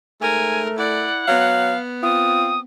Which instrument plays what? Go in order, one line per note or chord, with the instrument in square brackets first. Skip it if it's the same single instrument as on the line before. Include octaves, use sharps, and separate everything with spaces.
[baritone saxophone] G#2 [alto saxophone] A3 [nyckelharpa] A#4 [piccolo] G#5
[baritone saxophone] E4 [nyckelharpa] D5 [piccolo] F#5
[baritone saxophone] F#3 [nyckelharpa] B3 [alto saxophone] F5
[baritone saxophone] C4 [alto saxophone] F4 [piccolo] D#6